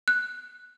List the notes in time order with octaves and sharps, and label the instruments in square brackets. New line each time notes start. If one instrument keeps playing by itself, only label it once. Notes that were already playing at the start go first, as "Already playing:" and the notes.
[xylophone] F#6